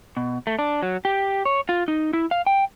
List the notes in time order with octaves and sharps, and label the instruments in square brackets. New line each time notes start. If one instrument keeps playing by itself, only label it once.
[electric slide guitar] B2
A3
D4
F#3
G4
C#5
F4
D#4
E4
F5
G5